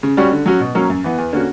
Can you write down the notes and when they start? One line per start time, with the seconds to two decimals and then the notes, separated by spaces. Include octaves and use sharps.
0.03 C#3
0.17 G3 C#4 F#4
0.32 D3
0.46 F#3 C#4 F#4
0.60 B2
0.75 F#3 A#3 C#4
0.90 F#2
1.04 E3 B3
1.18 E2
1.32 D3 A#3 C#4 F#4